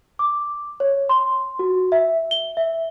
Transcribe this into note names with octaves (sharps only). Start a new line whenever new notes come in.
D6
C#5
C6
F#4
E5
G7
E5